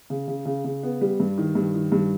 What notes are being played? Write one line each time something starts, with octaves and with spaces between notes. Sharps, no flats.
C#3
C#3
C#3
C#3
B3
G3
G2
D#3
G2
D#3
G2